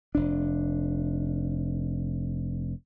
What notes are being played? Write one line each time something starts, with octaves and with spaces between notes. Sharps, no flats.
F1 D4